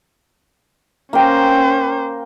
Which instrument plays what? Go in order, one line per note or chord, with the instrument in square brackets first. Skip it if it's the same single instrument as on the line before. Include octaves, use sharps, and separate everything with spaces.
[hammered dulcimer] A#3 G5 A#5 [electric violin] C#4 C5